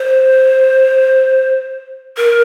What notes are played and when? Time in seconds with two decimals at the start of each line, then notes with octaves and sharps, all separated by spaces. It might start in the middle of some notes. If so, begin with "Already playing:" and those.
Already playing: C5
2.17 A#4